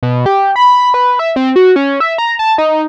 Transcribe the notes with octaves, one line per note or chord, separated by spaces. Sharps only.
B2
G4
B5
B4
E5
C4
F#4
C#4
E5
A#5
A5
D#4